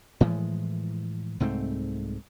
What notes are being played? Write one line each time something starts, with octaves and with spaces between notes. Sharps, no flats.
A2 E3 F3 G#3
C2 G#2 A3 C4